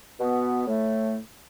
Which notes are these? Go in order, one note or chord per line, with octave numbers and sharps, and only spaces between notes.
B2 B3
A2 A3